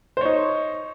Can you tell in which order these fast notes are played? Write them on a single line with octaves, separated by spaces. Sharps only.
C5 C#5 D#4